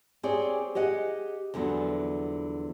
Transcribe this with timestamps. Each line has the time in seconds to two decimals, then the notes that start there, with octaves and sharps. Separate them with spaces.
0.23 C4 G4 G#4 C#5 D5
0.75 G4 G#4 D#5 F#5
1.54 E2 D3 F3 F#3 B3